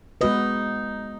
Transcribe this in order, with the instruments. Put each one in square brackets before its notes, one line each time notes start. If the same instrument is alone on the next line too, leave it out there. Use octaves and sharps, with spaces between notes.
[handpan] G#3 B3 F#4 B4 [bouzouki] D#4